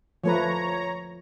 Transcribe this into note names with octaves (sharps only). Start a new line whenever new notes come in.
F3 A3 B4 C#5 A#5